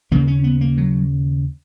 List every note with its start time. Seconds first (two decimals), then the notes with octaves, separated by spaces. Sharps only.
0.11 D#2 C#3 A#3
0.28 C#4
0.44 B3
0.61 A#3
0.78 F#3